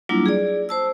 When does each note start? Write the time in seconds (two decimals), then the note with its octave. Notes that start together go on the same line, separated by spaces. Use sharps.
0.09 F#3 G3 A#3 D4 E4 F4
0.26 G#4 D5
0.69 C5 A5 E6